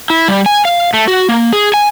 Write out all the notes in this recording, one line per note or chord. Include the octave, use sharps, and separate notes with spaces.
E4
G3
G#5
F5
A3
F#4
A#3
G#4
G#5